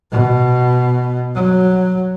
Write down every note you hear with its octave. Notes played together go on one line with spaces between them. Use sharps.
B2
F#3